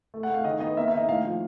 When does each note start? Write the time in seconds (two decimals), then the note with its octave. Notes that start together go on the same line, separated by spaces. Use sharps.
0.14 A3
0.23 F#5
0.30 A3 F5
0.44 D#3 D#5
0.60 B3 D#5
0.77 A#3 E5
0.88 E5
0.93 D#3 D#5
1.08 A2 F5
1.24 F3